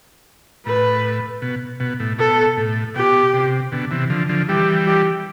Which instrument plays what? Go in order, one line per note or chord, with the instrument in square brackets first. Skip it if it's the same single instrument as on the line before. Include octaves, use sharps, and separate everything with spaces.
[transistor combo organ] A2 [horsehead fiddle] B4
[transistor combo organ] B2
B2
A2
[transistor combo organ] B2 [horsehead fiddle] A4
[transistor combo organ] A2
[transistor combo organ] B2 [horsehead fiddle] G4
[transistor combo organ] C3
B2 D3
C3 E3
D3 F3
D3 F3
[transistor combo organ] E3 G3 [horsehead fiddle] G4
[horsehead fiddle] G4